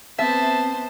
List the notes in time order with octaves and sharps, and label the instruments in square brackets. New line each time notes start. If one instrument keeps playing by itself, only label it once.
[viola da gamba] B3 C5 [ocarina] C4 [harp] E5 [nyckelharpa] A5